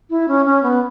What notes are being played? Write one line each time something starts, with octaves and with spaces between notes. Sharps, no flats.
E4
C#4
C#4
B3